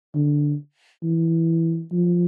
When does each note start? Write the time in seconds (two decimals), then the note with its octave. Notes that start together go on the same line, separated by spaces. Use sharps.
0.15 D3
1.03 E3
1.92 F3